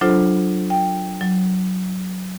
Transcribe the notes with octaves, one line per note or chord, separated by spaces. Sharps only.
F#3 D4 F4 A4 C5
G5
F#3